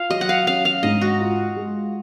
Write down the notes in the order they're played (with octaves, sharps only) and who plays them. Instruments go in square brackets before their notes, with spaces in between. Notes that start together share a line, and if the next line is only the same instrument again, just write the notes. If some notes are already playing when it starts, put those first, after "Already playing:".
Already playing: [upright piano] F4 [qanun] F5
[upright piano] F#3 [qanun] D#5
[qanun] F#5
F5
[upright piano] C#4 [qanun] F5
[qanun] F5
[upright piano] G#2 [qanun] D#5
[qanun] F#4
[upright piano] F4
G#3